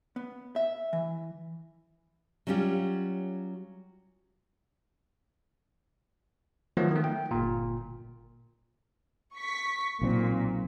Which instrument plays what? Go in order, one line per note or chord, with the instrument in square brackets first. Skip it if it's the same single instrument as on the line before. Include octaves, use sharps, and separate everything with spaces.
[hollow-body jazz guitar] B3
E5
E3
[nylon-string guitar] F#3 G3 C#4 F4 G4
[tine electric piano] D#3 F3 F#3 A3 B3 F4
D#3 A3
G5
G1 A#2
[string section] C#6 B6
[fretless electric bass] B1 E3 C4 [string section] A#2